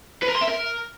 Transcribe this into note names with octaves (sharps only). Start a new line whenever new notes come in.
B4
A#4
C6
E5
A#4